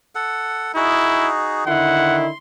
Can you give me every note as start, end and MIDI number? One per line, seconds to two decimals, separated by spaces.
0.15 0.72 69
0.15 0.72 78
0.76 1.64 63
0.76 1.31 64
0.76 1.64 66
0.76 1.64 68
1.66 2.29 50
1.66 2.29 51
1.66 2.29 64
1.66 2.18 78
1.66 2.38 84